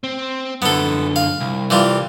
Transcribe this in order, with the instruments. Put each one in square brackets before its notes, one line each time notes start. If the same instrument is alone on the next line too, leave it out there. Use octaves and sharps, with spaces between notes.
[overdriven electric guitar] C4
[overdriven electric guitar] F#2 D3 [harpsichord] B3 A4
[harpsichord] F5
[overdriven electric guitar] C2
[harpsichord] E3 G3 F4